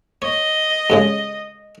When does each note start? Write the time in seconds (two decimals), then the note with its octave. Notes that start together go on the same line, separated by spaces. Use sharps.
0.22 C#5 D#5
0.90 G2 C#3 G#3